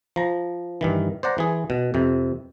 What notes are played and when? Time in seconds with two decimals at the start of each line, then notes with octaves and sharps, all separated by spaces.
0.16 F3 A#5
0.81 G2 D#3 E3
1.23 C5 D5 F#5 A#5
1.38 E3 G#4
1.70 B2
1.94 F2 C3